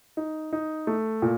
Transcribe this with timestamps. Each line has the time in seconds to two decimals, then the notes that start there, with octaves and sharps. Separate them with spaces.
0.17 D#4
0.53 D#4
0.87 A3
1.22 A#2